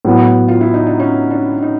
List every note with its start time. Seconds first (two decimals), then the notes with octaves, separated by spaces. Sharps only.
0.05 A2 F#3 B3
0.48 F4
0.61 E4
0.74 D#4
0.87 D4
1.00 C#4
1.31 D4
1.62 D#4